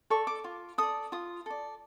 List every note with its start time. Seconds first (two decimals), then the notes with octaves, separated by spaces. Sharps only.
0.10 A4 D5 C#6
0.27 D6
0.44 F4
0.78 A4 D5 D#6
1.12 F4 D#6
1.46 A4 D5